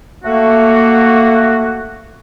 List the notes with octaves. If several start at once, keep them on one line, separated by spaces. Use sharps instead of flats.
A3 A#3 F#4